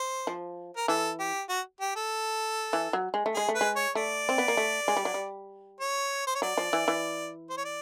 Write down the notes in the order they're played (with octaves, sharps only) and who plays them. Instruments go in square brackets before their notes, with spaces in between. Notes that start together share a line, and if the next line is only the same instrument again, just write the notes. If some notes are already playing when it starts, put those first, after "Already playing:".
Already playing: [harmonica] C5
[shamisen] F3
[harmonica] A#4
[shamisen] E3 [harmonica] A4
[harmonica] G4
F#4
G4
A4
[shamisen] E3
F#3
G#3
A3
[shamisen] G#3 [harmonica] G#4
[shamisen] A3
[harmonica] B4
[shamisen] G#3
[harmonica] C#5
[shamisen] A3 [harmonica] D5
[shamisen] C4
B3
A#3
A3
G#3
G3
F#3
G3
[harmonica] C#5
C5
C#5
[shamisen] F#3 [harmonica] D5
[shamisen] F3
E3
E3
[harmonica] C5
C#5
D5